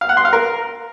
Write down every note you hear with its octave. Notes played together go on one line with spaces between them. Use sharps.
F5
F#5
C6
F5
A#4